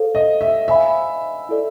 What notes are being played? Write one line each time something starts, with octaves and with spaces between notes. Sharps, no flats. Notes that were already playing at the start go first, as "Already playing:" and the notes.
Already playing: A4 C5 F5
D#5
E5
C5 E5 F5 G#5 B5
E4 A4 D5